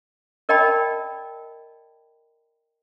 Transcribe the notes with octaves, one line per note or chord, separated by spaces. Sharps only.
A#4 D5 D#5 G5 A5 B5